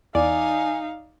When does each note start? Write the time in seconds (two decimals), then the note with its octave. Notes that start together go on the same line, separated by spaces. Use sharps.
0.15 E2 D#4 D5 F5 G#5